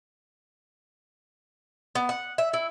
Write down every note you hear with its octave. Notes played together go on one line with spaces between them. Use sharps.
B3
F#5
E5
E4